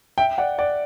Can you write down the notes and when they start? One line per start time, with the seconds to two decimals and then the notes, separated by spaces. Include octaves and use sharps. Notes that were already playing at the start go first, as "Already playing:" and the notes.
0.18 E5 G5
0.38 D5 F#5
0.58 D5 F#5